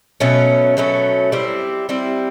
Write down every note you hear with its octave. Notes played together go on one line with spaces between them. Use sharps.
B2 F#3 A3 C#4
B2 F#3 A3 C#4
G3 C4 E4
G3 C4 E4